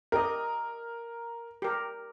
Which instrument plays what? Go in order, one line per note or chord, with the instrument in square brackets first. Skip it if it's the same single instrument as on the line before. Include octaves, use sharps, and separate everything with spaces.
[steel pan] G4 D#5 [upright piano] A#4
[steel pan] G4 A#4